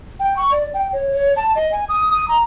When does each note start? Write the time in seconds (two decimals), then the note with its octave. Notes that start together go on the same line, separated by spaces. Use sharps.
0.20 G5
0.37 C#6
0.51 D5
0.74 G5
0.93 C#5
1.12 C#5
1.37 A5
1.55 D#5
1.72 G#5
1.89 D#6
2.12 D#6
2.28 A#5